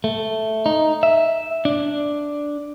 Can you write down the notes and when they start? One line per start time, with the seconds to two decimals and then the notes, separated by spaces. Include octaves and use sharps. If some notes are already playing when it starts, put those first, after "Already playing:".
0.04 A3
0.66 D#4
1.03 E5
1.65 D4